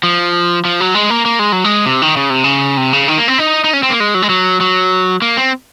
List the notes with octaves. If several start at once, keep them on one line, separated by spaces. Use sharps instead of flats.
F3
F3
F#3
G#3
A#3
A#3
G#3
F#3
G#3
C3
D#3
C#3
C3
C#3
C3
C#3
D#3
A#3
C4
D#4
D#4
C#4
C4
A#3
G#3
F#3
G#3
F#3
F#3
A#3
C4